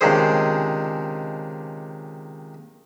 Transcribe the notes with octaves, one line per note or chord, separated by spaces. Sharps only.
C#2 C3 D#3 D4 G#4 C5